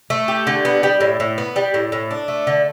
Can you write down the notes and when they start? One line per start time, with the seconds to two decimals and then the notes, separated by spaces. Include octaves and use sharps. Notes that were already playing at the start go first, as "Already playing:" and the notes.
0.10 A3
0.28 G4
0.47 D3
0.65 B3
0.83 G3
1.01 A2
1.20 A2
1.38 B3
1.56 G3
1.74 A2
1.92 A2
2.11 D4
2.28 A3
2.47 D3